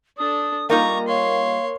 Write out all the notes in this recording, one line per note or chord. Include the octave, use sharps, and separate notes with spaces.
D4 A4 D#6
G3 A#3 D#4 F4 A#5 C#6
C#5 F5 C6